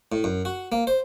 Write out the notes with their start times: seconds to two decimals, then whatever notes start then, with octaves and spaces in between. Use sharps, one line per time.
0.12 A2
0.24 F#2
0.45 F#4
0.72 A#3
0.87 C5